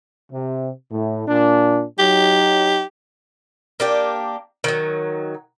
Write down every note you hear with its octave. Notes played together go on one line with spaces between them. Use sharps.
C3
A2
A#2 D4
F#3 D#4 G4
A#3 D4 G4
D#3 F#3